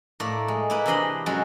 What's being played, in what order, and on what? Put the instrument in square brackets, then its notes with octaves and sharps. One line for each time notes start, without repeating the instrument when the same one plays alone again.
[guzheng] A2 A3 A#3 D5
G#3
A#3 E4 B4
C3 E3 D4 D#5 B5 C6
F#2 F#3 G#3 F#4 A4